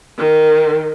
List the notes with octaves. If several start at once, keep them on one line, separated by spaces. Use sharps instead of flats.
D#3